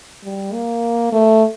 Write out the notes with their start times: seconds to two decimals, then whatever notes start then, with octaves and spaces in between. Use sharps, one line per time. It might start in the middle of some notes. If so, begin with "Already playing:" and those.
0.24 G3
0.53 A#3
1.12 A3